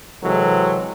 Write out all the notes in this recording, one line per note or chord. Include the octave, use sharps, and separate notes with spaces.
C3 E3 F#3 G#3 A4